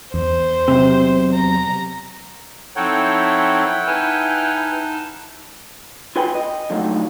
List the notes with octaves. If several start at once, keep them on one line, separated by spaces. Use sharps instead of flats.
E2 C5
B1 C3
A#5
F3 C4 D#4 E4 A4 C#5 F#5 G5
D#4 B4 G#5 A5 F6
F4 B4 G5 G#5 B5
D#5
D3 F3 F#3 A3 D#4